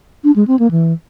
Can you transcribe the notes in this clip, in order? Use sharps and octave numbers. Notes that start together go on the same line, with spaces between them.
D4
G#3
C4
A#3
E3